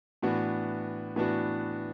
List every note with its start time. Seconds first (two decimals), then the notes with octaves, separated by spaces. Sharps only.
0.22 A2 E3 B3 D4 F#4
1.16 A2 E3 B3 D4 F#4